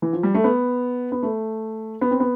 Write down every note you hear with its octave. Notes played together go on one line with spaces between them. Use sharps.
E3
F3
G3
A3
B3
B3
A3
B3
C4
B3